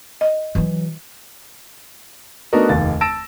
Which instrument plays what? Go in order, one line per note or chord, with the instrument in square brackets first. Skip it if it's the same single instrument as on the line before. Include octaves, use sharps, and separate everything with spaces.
[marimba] D#5
[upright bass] E3 F#3
[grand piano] A3 B3 D4 D#4 F#4 A#4
F1 D#2 A6
A5 E6 A6 A#6 D7 E7